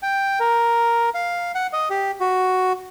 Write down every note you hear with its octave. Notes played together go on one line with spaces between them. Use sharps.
G5
A#4
F5
F#5
D#5
G4
F#4